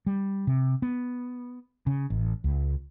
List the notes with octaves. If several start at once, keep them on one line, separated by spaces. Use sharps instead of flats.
G3
C3
B3
C#3
A1
C#2